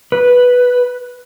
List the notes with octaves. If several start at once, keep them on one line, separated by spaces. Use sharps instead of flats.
B4